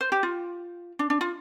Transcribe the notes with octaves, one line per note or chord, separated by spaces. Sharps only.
C5
G4
F4
D4
D4
F4